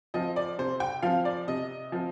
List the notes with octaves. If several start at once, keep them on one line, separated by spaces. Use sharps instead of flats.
F3 C4 D#5
D5
C3 C5
G5
F3 C4 F5
D5
C3 D#5
F3 C4